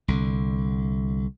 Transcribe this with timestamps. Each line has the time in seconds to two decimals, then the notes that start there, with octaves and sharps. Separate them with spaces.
0.08 C2 D3